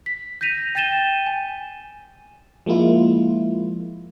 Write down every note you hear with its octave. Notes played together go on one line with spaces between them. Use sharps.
B6
G6 A#6 B6 D#7 F7
G5 G6 A6 D#7 E7 G7
G#5
F3 G#3 A#3 E4 F4